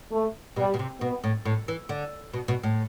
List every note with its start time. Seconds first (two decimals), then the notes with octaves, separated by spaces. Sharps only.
0.12 A3
0.56 B2 G3
0.74 B2
0.79 C3
1.01 B2 B3
1.24 A2
1.45 A2
1.68 E3
1.89 D3
2.33 B2
2.48 B2
2.63 A2